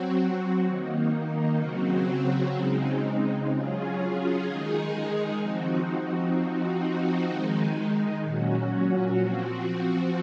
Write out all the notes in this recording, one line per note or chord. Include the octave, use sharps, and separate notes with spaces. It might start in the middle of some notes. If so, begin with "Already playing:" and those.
Already playing: F#3 C4 F#4
D#3 A#3 D#4
C#3 F#3 C4 F#4
C#3 G#3 C4 D#4
F#3 C#4 F4 G#4
D#3 G#3 D#4 G#4
F3 C4 D#4 F#4
F3 C4 D#4 F#4
D#3 G#3 D#4
A#2 F#3 C#4 F#4
F3 C4 F#4